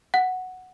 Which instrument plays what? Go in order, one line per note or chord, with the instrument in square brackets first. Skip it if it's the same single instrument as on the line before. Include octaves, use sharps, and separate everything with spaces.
[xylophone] F#5